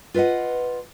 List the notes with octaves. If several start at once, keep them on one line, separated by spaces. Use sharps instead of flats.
F4 B4 D5 D#5 F#5